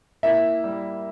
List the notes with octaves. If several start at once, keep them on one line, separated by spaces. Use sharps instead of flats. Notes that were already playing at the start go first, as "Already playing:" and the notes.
A#3 E4 E5
G3